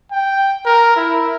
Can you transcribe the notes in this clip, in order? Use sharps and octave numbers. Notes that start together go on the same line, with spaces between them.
G5
A#4
E4